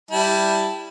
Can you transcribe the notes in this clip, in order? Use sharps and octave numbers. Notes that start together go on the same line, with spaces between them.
G3 E4 A5